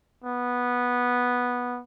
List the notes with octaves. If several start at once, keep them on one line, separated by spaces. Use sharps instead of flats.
B3